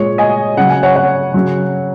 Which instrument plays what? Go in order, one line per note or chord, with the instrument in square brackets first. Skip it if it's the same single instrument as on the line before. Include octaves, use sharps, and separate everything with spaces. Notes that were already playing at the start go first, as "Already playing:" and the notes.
Already playing: [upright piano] A#2 G#3 C#5
D#5 G#5
C#3 F#3 F#5
G#5
C#5 F#5
C#5 F#5
C#3 F#3